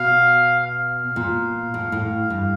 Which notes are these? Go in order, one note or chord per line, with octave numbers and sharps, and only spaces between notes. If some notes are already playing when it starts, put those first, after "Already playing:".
Already playing: B2 F5
F5
A#2
A2
A2
G2